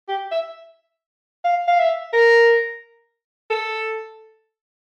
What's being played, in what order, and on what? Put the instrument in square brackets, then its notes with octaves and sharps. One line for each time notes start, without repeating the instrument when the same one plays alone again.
[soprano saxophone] G4
E5
F5
F5
E5
A#4
A4